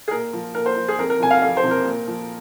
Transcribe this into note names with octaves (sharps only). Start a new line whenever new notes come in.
G#4
A#2 A#4
F3
A#2 A#4
C5
F3
G#4
F2 A#4
A#4
C3 F3 G#5
F5
F2 F5
C5
C3 F3
A#4
A#2
F3